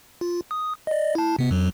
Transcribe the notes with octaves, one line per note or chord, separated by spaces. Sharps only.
F4
D#6
D5 D#5
E4 A5
C3 B3
F2 F#3